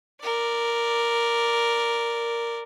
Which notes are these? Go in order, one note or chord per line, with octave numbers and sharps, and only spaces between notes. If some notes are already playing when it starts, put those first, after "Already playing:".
A#4 D5